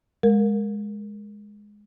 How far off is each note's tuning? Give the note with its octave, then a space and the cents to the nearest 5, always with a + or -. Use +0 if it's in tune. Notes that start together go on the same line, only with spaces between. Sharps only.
G#3 +0 A#4 +0